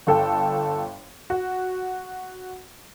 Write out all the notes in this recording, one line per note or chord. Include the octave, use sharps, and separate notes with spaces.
G1 A4 G5
F#4